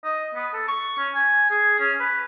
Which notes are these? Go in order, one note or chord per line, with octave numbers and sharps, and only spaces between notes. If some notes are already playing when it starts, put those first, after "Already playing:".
D#5
B3
A4
C#6
C#4
G#5
G#4
C#4
B4